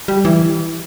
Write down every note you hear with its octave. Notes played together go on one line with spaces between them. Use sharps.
G3
E3